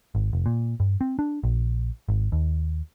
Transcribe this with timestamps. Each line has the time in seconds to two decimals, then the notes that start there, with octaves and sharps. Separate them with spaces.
0.15 G#1
0.33 F1
0.46 A#2
0.80 G2
1.01 C4
1.19 D4
1.43 A#1
2.09 G#1
2.32 D#2